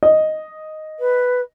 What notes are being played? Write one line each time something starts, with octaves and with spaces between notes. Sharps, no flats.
D#5
B4